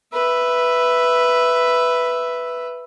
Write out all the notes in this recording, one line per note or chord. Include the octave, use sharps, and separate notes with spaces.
B4 E5